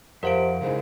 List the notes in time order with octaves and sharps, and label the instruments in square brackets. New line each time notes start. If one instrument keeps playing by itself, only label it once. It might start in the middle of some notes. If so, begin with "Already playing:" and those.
[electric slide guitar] F2 [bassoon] C3 [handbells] A#4 F5 D7 [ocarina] F#5
[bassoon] G#2 [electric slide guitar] C#3 G#3 E4 [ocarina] G#4